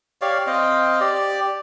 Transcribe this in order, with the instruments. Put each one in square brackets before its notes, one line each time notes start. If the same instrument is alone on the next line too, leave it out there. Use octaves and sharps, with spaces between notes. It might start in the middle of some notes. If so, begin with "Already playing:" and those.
[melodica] G4 C#5 D5 F5
C4 D#5 F5 G5
G4 D5